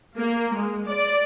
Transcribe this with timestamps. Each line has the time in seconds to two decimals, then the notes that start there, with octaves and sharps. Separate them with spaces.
0.17 A#3
0.54 G#3
0.87 D5